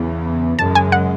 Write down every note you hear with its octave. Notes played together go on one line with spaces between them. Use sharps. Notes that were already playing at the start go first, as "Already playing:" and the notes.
Already playing: E2 C#3 E3 B3
F#2 C#3 G#3 A5
G#5
F#5